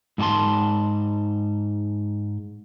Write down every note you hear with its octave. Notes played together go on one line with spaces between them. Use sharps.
G#2 E4 F#4 A5 C6